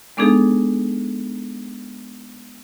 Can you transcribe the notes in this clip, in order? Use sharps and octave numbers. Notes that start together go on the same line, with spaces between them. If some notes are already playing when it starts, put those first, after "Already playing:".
G#3 B3 D4 D#4 G#4 A4